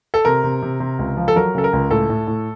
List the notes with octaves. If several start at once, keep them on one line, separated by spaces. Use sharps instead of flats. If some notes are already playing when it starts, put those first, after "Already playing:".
A4
C3 A#4
C3
C3
C3
C#2
F3
A4
F#3 A#4
C#3 A4
A#4
C#2
A2 A4
A2
A2